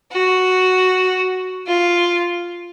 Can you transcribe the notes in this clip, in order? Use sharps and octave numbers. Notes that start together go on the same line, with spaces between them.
F#4
F4